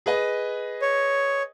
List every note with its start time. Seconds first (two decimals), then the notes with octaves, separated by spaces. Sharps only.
0.06 G#4 B4 D#5
0.82 C#5